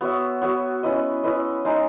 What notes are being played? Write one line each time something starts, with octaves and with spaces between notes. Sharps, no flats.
B3 F#4 C#5 E5
B3 F#4 C#5 E5
C#4 E4 B4 D#5
C#4 E4 B4 D#5
G#3 D#4 G#4 D#5